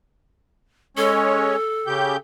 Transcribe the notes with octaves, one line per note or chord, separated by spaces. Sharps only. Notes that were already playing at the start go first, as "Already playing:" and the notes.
G#3 C#4 A4 C#5
C#3 G4 G6